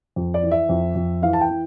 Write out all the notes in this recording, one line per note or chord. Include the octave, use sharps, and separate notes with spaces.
F2
D5
E3
E5
F2
F2
E3 F5
A5
G5
E3